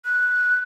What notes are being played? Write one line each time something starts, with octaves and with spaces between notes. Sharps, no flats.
F#6